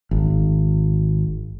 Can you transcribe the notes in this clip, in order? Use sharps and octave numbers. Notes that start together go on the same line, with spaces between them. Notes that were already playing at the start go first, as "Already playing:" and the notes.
G#1